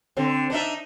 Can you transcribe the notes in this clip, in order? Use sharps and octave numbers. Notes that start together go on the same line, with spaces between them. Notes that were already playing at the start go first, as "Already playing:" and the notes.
D3 C4
D4 D#4 E5